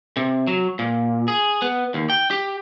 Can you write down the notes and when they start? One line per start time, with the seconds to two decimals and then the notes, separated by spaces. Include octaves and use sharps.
0.17 C3
0.47 F#3
0.79 A#2
1.28 G#4
1.62 B3
1.94 D#2
2.10 G5
2.31 G4